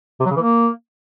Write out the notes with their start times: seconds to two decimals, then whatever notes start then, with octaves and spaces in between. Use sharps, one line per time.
0.20 C3
0.26 F#3
0.31 C#3
0.36 E3
0.42 A#3